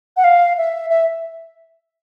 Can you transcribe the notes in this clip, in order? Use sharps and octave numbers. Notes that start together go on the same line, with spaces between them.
F#5
F5
E5
E5